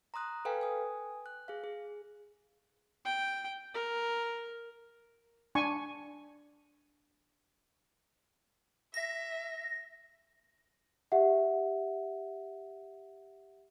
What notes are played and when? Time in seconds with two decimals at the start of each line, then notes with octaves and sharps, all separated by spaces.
0.14 A#5 C6 D#6 F#6
0.45 A4 B4 F5 G5 G#5
0.61 G#5 D#6
1.26 F#6
1.48 G#4 F5
1.64 G#4
3.05 G5
3.74 A#4
5.55 D4 G#5 C#6
8.94 E5 A#6
11.12 G4 E5 F#5